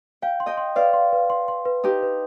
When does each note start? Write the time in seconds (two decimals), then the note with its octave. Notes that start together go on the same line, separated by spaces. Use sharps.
0.22 F5 G5
0.40 C6
0.46 D#5 G5
0.57 C6
0.76 B4 D5 F5
0.93 C6
1.13 B4
1.30 C6
1.48 C6
1.65 B4
1.84 D#4 G4 B4
2.03 B4